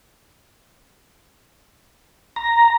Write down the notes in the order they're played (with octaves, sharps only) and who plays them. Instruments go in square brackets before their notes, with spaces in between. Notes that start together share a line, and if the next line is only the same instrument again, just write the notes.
[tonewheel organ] A#5